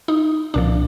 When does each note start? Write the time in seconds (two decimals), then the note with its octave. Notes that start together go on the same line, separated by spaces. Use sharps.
0.08 D#4
0.54 C2 A#2 F3 D4